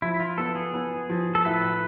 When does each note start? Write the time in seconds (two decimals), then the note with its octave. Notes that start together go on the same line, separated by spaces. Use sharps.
0.02 F3 E4
0.20 F4
0.38 B3 A4
0.55 G#4
0.74 B3
1.09 F3
1.35 A4
1.45 A2 B4